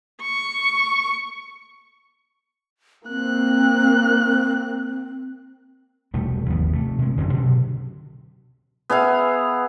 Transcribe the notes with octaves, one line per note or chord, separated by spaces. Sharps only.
C#6
A#3 C4 F#6
E1 C2 G3 A3
G1 D#2 F3 B3
C3 A3
C3 G#3
F#2 D3 F#3 C#4
B2 D3 F#3
B3 G#4 E5 F5